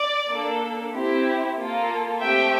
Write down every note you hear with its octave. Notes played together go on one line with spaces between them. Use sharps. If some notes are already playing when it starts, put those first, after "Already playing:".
Already playing: D5
A#3 D4 A4
C4 E4 G4
A#3 F4 A4
A3 C4 G4 E5 G5